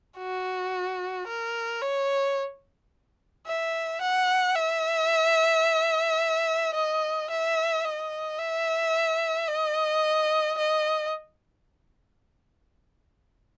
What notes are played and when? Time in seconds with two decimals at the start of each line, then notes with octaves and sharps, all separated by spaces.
0.18 F#4
1.28 A#4
1.82 C#5
3.47 E5
4.01 F#5
4.56 E5
6.75 D#5
7.30 E5
7.85 D#5
8.39 E5
9.48 D#5
10.58 D#5